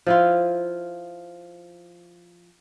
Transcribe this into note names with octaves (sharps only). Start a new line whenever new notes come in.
F3 E4 F4